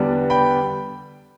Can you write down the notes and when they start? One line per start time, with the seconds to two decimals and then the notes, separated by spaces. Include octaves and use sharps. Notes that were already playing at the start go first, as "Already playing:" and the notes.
Already playing: E2 D3 G3 B3 D4
0.30 G5 B5